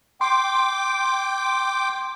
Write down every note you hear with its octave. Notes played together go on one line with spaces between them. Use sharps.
G5 C6 D6